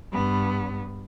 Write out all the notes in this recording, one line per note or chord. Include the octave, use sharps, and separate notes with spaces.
G2 B3